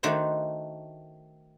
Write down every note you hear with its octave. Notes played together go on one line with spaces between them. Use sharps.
D#3 A3 D4 F#4 C5 C#5